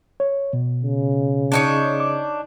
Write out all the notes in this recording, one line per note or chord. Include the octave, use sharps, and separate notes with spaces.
C#5
B2
C#3
D4 D#4 C#5
D6